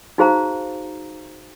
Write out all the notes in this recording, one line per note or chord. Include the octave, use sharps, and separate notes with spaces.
D#4 F#4 G#4 C5 F5 A#5